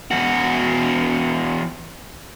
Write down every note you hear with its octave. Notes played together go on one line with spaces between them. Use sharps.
E2 F#4